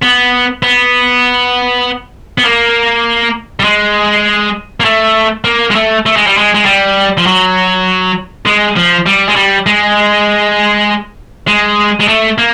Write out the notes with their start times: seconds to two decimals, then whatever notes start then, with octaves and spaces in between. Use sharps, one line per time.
0.03 B3
0.63 B3
2.38 B3
2.44 A#3
3.60 G3
3.64 G#3
4.80 A#3
4.84 A3
5.45 A#3
5.70 G#3
5.75 A3
6.06 A3
6.16 G#3
6.26 G3
6.37 G#3
6.54 G#3
6.65 G3
7.18 F3
7.26 F#3
8.47 G#3
8.76 F3
9.07 G3
9.29 G#3
9.36 G3
9.66 G#3
11.47 G#3
12.00 G#3
12.08 A3
12.38 A#3